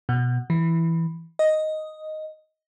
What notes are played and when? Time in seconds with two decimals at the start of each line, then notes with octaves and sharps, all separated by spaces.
0.09 B2
0.50 E3
1.39 D#5